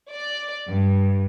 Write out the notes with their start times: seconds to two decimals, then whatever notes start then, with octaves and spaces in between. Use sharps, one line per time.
0.11 D5
0.68 G2